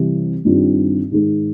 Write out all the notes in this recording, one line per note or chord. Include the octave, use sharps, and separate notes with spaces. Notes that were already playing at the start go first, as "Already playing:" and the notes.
Already playing: C3 E3 G3
G2 D#3 G3 C4 F4
G#2 D#3 G#3